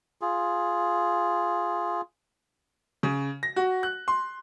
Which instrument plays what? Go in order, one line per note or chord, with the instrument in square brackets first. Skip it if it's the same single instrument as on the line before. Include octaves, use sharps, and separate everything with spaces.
[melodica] F4 G#4
[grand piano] C#3
A#6
F#4
F#6
C6